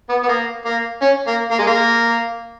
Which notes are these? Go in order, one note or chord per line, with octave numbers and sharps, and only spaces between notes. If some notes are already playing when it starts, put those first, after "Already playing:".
B3
B3
A#3
A#3
C#4
A#3
A#3
G#3
A#3